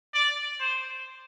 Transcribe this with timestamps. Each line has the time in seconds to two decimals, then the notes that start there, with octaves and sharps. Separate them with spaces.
0.14 D5
0.60 C5